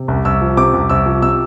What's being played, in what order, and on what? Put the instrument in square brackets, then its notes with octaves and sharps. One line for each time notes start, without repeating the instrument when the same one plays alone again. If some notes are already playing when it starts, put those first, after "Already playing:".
Already playing: [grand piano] C3
C2
C2 E6
F3
C3 D6
C2
C2 E6
F3
C3 E6